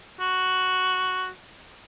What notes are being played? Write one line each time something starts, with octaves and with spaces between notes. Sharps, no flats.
F#4